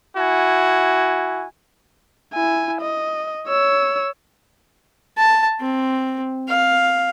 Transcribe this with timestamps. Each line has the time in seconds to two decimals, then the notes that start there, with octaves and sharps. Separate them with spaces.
0.17 E4 F#4 G#5
2.34 E4 G#5
2.82 D#5
3.48 C#5 E6
5.18 A5
5.60 C4
6.49 F5